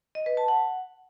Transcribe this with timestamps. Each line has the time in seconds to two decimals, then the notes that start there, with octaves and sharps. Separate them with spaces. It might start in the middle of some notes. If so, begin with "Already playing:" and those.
0.15 D#5
0.26 B4
0.37 A5
0.48 F#5